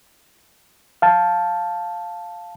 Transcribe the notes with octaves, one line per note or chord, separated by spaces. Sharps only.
F5 A5